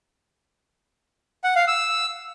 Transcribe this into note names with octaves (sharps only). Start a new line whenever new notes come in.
F#5
F5
E6